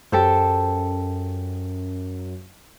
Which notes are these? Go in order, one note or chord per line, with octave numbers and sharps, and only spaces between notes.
F#2 G4 A4 C5